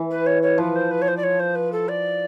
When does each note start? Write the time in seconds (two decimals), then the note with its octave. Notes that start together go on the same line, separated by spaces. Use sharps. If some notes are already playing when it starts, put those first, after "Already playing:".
Already playing: E3
0.10 B4
0.26 C#5
0.42 C#5
0.58 F3 B4
0.75 C5
0.90 B4
1.01 C#5
1.07 C5
1.17 D5
1.23 C#5
1.39 C5
1.55 B4
1.72 A4
1.88 D5